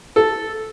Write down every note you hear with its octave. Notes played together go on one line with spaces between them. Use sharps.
A4